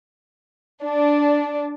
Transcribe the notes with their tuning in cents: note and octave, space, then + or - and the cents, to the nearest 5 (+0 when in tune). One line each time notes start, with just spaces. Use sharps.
D4 -5